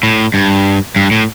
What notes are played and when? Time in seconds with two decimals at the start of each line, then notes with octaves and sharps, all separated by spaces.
0.03 A2
0.34 G2
0.96 G2
1.11 A2